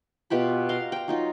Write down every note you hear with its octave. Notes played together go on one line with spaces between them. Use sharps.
B2 F4 G4 B5
F5 A#5 C6
G5 A#5
F#3 D#4 F4